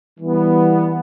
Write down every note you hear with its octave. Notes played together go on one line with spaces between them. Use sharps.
E3 G3 B3